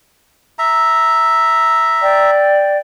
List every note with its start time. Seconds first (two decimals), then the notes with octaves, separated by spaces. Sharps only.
0.59 E5 A#5
2.01 D5 G5